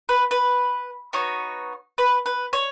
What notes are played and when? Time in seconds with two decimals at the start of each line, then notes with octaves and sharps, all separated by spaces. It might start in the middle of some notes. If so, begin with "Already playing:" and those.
0.09 B4
0.31 B4
1.13 B3 D#4 F#4 C#5
1.98 B4
2.26 B4
2.53 C#5